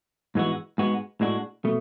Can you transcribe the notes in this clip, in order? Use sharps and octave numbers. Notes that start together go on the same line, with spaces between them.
G#2 E3 G#3 B3 F#4
G#2 G#3 B3 F#4
A2 G#3 D4 F#4
B2 A3